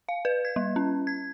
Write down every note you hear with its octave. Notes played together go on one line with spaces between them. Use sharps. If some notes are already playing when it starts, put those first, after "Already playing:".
F5
B4
G#6
G3
C#4
G#6